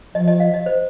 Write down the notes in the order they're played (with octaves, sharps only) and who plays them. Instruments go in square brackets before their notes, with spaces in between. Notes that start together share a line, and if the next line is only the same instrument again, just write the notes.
[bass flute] F3 [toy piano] D#5
[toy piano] D#5
F5
D#5
C5